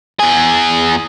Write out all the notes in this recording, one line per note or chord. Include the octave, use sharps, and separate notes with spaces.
E2 G#4